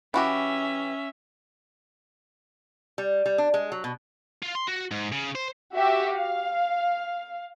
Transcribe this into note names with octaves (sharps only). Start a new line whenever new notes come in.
E3 C#4 F#4 G4 E5
G3
G3
D4
G#3
F#3
B2
F4
C6
F#4
G#2
C#3
C5
F#4 G4 E5
F5